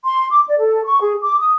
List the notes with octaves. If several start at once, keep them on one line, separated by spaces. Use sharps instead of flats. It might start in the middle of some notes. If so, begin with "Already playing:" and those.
C6
D6
D5
A4
C#6
G#4
D6
D#6